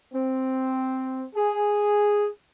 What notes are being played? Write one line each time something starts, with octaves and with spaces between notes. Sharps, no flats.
C4
G#4